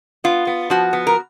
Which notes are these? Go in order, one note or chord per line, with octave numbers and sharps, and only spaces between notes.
B3 F4
B3
F3 F#4
B3
A#4